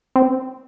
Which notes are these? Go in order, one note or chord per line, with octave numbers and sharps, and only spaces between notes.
C4